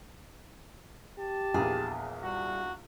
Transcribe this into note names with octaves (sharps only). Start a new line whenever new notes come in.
G4 A5
A#1 E2 G#4
G3 F#4